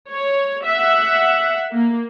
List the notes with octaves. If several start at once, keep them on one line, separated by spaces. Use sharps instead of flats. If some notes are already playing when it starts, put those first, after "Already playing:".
C#5
E5 F#5
A#3